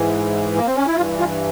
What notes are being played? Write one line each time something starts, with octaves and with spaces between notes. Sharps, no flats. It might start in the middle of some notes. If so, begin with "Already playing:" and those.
Already playing: G#2 E3
A#3
C4
C#4
E4
G2 E3 F4
F4